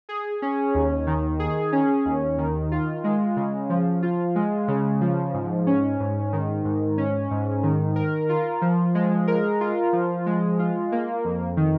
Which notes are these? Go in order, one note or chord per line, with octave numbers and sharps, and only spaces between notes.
G#4
C#4
D#2
D#3
G#4
C#4
D#2
D#3
F4
G#3
C#3
F3
F4
G#3
C#3
F3
G#2
C#4
G#2
D#3
G#2
C#4
G#2
D#3
A#4
F4
F3
G#3
A#4
F4
F3
G#3
F4
A#3
F2
D#3